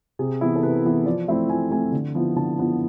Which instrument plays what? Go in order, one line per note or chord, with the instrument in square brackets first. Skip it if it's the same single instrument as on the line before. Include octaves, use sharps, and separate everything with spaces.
[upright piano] C3 G#4
E3 B3 E4
A4
C3 B4
E3 B3 E4
F3 D5
A3 C4 E4 E5
F3 G#5
A3 C4 E4 G#5
D3
F3 B3 E4
D3 A5
F3 B3 E4